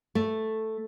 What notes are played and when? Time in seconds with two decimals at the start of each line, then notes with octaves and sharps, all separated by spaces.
0.15 A3